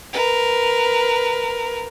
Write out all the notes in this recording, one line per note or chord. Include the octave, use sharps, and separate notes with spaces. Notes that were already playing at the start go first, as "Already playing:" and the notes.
A#4 B4